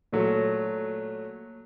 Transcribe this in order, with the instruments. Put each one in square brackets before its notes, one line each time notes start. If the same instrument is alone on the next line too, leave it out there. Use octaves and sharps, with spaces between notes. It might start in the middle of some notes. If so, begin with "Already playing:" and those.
[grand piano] A#2 F#3 A3